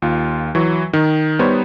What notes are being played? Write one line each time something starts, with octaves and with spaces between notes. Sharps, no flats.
D#2 F4
E3 F#3 C#6
D#3
G3 B3 D#4 C5 C#5